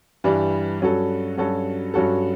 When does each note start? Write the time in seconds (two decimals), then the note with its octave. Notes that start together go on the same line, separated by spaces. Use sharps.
0.24 G2 E3 G3 D4
0.80 G2 F#3 C#4 F#4 A4
1.37 G2 F#3 C#4 F#4 A4
1.94 G2 F#3 C#4 F#4 A4